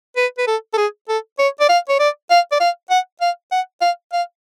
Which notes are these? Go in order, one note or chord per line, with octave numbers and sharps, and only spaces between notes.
B4
B4
A4
A4
G#4
A4
C#5
D5
F5
C#5
D5
F5
D5
F5
F#5
F5
F#5
F5
F5